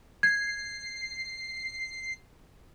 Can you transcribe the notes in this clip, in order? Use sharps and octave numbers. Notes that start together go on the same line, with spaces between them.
G#6 C7